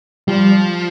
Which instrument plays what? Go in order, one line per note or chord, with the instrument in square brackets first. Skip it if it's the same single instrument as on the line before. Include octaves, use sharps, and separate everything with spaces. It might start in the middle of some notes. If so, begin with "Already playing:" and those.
[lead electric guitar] F3 [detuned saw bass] G3